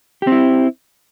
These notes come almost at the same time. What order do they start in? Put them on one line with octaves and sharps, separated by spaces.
G4 C4 E4